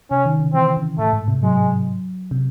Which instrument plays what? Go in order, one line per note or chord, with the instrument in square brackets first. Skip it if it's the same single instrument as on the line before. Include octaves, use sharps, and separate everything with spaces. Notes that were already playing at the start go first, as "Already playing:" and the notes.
[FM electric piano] C3 [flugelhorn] C#4
[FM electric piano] D#3
C#3
[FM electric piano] E3 [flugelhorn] C4
[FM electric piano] C#3
[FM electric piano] A2 [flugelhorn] A3
[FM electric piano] G#2
C3
[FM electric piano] F#3 [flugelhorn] G#3
[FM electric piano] C3